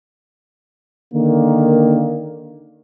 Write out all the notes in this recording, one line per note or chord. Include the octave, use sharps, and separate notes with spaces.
D3 D#3 A#3